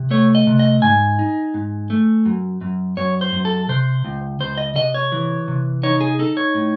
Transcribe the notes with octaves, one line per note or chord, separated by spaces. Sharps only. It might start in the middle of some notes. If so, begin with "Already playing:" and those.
Already playing: C3
A3 C#5
D#5
C3
D#5
G#2 G#5
D#4
G#2
A3
F#2
F#2
F#2 C#5
C5
F#2
A4
C3 C5
C#2
C#2 C5
D#5
C3 D#5
C#5
E3
C3
D#4 C#5
G#4
D#4 A4
C#5
A2